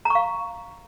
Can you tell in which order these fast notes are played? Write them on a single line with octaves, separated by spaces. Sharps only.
A#5 C#6 F5